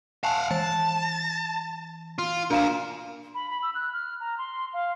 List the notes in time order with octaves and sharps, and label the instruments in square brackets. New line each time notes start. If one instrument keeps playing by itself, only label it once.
[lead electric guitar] F5 F#5 [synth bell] G#5 A5
[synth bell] E3 [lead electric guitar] A5
[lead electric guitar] F4
[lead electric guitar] A#2 A#4 [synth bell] D4 F5 E7
[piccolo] B5
B5
E6
F#6
F6
A#5
C6
F5